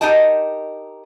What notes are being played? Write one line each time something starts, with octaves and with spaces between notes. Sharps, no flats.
D#4 G4 A#4 D#5 A5